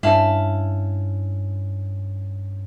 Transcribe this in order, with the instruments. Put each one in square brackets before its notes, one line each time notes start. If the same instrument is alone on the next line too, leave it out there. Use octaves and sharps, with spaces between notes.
[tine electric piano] G2 C#4 [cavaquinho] E4 F5 A5